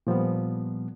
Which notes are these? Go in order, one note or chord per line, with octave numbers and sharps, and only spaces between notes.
A#2 F3 G3 B3